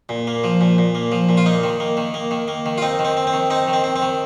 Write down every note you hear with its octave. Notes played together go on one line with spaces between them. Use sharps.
A#2
A#3
F3
A#2
A#2
A#3
F3
A#2
F4
A#3 D#4
D#3
A#3
D#3
A#3
D#3
A#3
D#3
F4
C4 D#4
D#3
C4
C4
C4
D#3
C4 D#4
D#3
C4
C4
C4
D#3